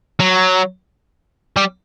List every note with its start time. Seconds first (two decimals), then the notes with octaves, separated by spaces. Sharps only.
0.20 F#3
1.57 G3